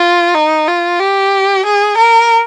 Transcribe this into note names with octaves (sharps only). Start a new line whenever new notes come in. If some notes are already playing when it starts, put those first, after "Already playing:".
Already playing: F4
D#4
F4
G4
G#4
A#4